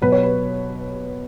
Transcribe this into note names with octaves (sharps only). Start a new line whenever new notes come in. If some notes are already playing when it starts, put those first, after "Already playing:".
B2 F#3 B4
C#5
B4